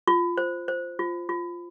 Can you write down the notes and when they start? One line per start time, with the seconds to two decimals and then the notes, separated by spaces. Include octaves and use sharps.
0.08 F4
0.38 C5
0.68 C5
0.99 F4
1.29 F4